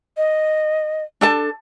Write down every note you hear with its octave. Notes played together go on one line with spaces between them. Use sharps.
D#5
D4 A4 A5